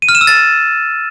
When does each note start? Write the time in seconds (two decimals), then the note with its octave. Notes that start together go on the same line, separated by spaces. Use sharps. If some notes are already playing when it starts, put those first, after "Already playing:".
0.02 D#7
0.09 F6
0.15 E7
0.21 E6
0.27 A6